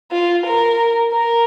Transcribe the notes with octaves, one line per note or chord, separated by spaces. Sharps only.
F4
A#4
A#4